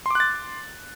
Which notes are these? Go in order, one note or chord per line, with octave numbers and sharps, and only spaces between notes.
C6 D6 F#6 A6